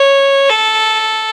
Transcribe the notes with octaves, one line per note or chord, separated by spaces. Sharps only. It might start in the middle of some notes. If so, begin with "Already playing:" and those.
Already playing: C#5
A4